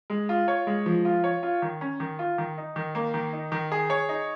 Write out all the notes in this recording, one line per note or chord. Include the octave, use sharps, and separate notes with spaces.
G#3
F4
C#5
G#3
F3
F4
C#5
F4
D#3
C#4
D#3
F4
D#3
D#4
D#3
A#3
D#3
D#4
D#3
G#4
C#5
D#4